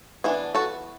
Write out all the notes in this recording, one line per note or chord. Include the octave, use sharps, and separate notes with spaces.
E3 B3 D4 E4 G#4
F#4 A4